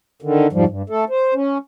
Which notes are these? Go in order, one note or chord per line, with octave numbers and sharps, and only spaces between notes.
D3 D#3
F2 G#2 F3 G3
G2
A3 A4
C5
C#4